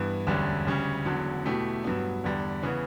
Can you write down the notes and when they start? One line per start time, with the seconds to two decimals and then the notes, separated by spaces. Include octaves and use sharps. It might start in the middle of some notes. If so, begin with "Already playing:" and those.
Already playing: G2 E3 B3
0.27 E1 D2 D3 G3 C#4
0.67 D2 C#3 G3 C#4
1.05 E1 E2 D3 F#3
1.45 B2 A3 E4 G4
1.84 G2 F#3 B3
2.24 E2 D3 G3
2.63 C#3 E3 B3